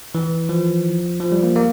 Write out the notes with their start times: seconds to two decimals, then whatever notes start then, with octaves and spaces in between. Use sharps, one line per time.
0.15 E3
0.49 F3
1.20 F3
1.32 G3
1.43 A#3
1.56 A#3